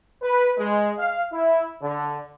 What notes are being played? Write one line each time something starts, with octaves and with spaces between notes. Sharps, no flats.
B4
G#3
F5
E4
D3